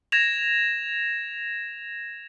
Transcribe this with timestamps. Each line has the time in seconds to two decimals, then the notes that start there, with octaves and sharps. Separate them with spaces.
0.12 G#6 A#6 E7 F7